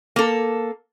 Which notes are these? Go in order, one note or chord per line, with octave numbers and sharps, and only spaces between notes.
A#3 A4